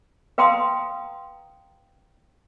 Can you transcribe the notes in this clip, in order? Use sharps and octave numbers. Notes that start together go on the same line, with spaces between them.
B4 F5 G5 A#5 C6 D#6